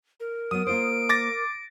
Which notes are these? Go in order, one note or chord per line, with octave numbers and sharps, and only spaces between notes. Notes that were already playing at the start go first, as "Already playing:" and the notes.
A#4
F#3 B3 D#6 D#7
A#3 F4 C5 D7
D6 A6 A#6